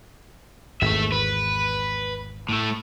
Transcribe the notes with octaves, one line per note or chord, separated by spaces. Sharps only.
G#1 E2 A3 E5
B4
A2 A3